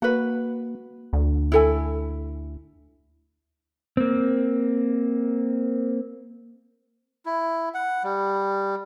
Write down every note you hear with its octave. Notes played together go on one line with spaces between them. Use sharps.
A#3 F#4 B4
D2
E4 A4 G#5
A#3 C4
E4
F#5
G3